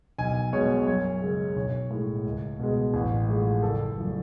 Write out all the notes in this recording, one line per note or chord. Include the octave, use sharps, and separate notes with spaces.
B1 G#5
B2 G#3 C#5
F#2 C#5
C#3 G#3
B1 C#5
A2 G#3
C#2
B2 G#3
A1
A2 F3 G#3
F#1 A4
F#2 C#3 F3 A3